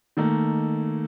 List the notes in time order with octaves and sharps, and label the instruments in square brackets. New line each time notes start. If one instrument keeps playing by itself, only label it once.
[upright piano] D#3 A3 A#3